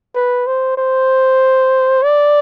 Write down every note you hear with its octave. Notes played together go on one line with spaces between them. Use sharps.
B4
C5
C5
D5